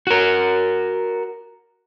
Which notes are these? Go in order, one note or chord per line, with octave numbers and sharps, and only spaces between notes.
F#4 A#4